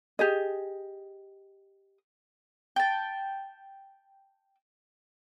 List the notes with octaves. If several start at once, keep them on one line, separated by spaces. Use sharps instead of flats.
G4 G#4 D#5
G5 A5